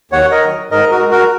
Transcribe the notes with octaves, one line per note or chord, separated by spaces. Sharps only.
D#2 C#5 F#5
A#4 D#5
D#3 F#3
G#2 A#4 D#5
F#4 A#4
G#3
F#4 A#4